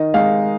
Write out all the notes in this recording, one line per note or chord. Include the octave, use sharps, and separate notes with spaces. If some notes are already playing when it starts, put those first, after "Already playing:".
Already playing: D#3 D#5
G#3 D#4 F5